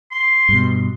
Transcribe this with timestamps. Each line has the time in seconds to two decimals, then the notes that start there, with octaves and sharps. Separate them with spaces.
0.11 C6
0.49 G2 B2